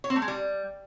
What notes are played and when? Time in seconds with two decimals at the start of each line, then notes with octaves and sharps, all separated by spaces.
0.04 C#5
0.10 C4
0.16 A3
0.22 G#3
0.28 G3